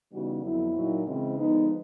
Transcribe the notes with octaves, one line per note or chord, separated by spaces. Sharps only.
C#3 E3 G3 B3 D#4 F#4
F2 D3 F#3 B3 E4
A#2 F#3 A#3 D#4
C#3 E3 G#3 C4
D3 F3 G#3 B3 D#4